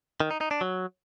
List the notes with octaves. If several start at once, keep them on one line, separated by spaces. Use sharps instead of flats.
D#3
D#4
D#4
D4
F#3